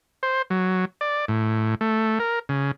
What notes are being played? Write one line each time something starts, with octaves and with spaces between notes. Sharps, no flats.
C5
F#3
D5
A2
A3
A#4
C#3